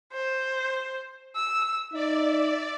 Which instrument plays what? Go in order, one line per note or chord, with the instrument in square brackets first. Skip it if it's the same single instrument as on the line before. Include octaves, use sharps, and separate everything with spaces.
[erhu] C5
E6
[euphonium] D#4 [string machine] D5 [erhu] E5